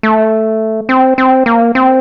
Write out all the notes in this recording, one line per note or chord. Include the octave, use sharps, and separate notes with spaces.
A3
C4
C4
A#3
C4